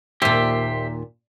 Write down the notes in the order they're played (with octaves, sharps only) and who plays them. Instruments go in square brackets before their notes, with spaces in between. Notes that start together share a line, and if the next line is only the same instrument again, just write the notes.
[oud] D#2 A#2 [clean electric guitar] G4 C5 E5